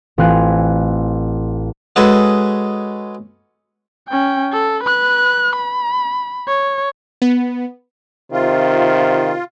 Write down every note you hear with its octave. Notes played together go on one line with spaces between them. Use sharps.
A1 C4 F4 F5 G#5 F#6
G#3 C#4 F#4 G#4 A4 B4
C#4 G5
A4
B4 F#6
B5
C#5
B3
C3 D#3 F4